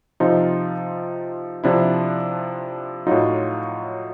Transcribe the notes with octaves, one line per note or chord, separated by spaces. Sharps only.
C3 F3 D#4 F4
C3 F3 D4 E4
A2 F#3 D#4 F4